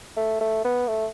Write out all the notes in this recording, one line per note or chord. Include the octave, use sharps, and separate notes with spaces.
A3
A3
B3
A3